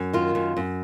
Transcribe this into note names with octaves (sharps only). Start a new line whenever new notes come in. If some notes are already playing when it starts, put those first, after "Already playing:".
Already playing: F#2
D#3 F4
F#2
F#2